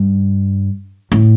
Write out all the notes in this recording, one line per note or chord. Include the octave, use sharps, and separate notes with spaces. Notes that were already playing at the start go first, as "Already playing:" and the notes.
Already playing: G2
A2